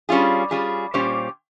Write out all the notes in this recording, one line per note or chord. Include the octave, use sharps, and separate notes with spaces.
G3 C#4 F4 G#4
G3 C#4 F4 G#4
A#2 G3 C#4 G4 C5